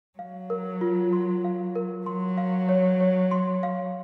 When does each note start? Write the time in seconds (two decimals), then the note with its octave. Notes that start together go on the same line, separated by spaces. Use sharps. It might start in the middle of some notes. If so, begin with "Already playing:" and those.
0.18 F#3 F5
0.50 A#4
0.81 F4
1.13 C6
1.44 F5
1.76 A#4
2.06 F#3 C6
2.38 F5
2.69 C#5
3.01 C#5
3.31 C6
3.63 F5